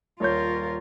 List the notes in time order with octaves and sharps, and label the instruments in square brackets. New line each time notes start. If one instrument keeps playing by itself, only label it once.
[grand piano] D#1 C#5 G6 [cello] F4 A#4